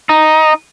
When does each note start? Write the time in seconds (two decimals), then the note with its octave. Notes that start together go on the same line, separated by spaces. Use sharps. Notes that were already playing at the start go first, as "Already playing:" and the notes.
0.09 D#4